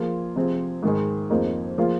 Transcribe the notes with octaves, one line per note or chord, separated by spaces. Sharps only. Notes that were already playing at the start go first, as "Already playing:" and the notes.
Already playing: F3 A#3 F4 G#4
C3 F3 C4 G#4
G#2 D#3 G#3
F2 F3 A#3 D#4 G#4
F3 A#3 F4 G#4